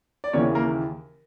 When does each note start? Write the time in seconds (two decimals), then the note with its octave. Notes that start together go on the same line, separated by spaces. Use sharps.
0.24 D5
0.33 D#2 C#3 E3 C#4 C#5
0.55 A#3 A#4